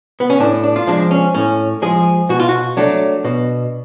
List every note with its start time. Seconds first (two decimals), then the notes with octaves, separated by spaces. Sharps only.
0.20 B3
0.30 C#4
0.39 A2 D4
0.63 D4
0.76 F4
0.87 F3 G#3 D4
1.11 C#4
1.34 A2 C#4
1.82 F3 G#3 G#4
2.29 B2 F#4
2.40 F4
2.49 F#4
2.77 F#3 A3 D4
3.24 B2